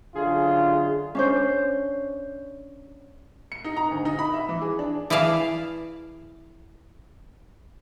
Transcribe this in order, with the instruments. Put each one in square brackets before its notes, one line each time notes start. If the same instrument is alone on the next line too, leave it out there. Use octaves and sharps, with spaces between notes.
[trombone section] A1 F#2 F4 [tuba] D3 [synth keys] G#4
[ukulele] C#4 D4 C5
[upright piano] C#7
D#4
A#5
D2
D#4
B5
E5
E3
G#4
D4
[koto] E3 E4 G#4 D5 F5 A5